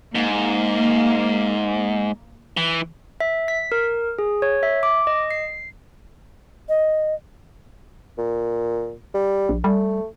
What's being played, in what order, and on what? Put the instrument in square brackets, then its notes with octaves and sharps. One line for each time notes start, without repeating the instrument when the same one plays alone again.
[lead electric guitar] G#2 [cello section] A#3
[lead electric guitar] E3
[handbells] E5
B6
A#4
G#4
C#5
E5
D6
D#5
C7
[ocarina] D#5
[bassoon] A#2
G3
[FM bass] A#1
[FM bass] G3 [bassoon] A3